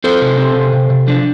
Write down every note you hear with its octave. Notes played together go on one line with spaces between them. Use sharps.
C4 A4 C5
C3
C4
C3
C3
C3
F3 D4